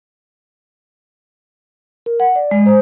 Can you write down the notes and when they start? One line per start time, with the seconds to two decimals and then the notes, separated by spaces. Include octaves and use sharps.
2.06 A#4
2.20 F#5
2.36 D5
2.51 G#3
2.66 C5